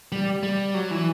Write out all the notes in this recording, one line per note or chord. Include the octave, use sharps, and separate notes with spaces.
G3
G3
F#3
E3